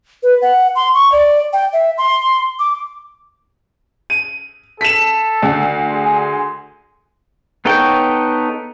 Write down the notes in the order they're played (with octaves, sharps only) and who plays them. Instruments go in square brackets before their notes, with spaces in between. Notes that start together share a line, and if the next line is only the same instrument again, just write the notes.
[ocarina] B4
F#5
C6
C#6
D5
G5
E5
C6
D6
[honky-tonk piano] D#7
[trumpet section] A4 [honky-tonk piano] B6 E7
[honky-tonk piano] D2
[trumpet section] G#4 G#5 C6
[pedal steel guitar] B3 D#4 A4 C#5 G5